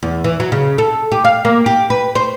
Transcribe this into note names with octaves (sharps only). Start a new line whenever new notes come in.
E2
E3
F#3
C#3
A4
G4
F5
A#3
G4
B4
C5